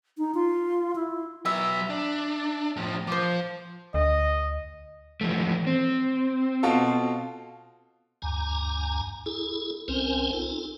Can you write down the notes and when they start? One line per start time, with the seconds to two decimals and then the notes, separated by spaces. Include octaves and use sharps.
0.18 D#4
0.34 F4
0.96 E4
1.46 F#3 B4 E5
1.90 D4
2.76 A2 F3
3.07 F3 C5 D6
3.94 D2 D#5
5.21 E3 F3 A3
5.67 C4
6.63 B2 F4 A4
8.22 D2 G2 G#5 A#5
9.26 E4 G#4 A4
9.88 C2 C4 C#4 A#4 C5 G#5
10.33 D#4 F4 A4